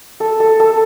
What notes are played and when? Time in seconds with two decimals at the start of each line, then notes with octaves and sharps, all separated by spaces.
0.20 A4
0.40 A4
0.60 A4